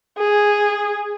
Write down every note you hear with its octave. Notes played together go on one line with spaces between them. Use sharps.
G#4